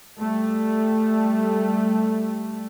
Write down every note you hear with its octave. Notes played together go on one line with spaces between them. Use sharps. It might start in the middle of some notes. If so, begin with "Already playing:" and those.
G3 A3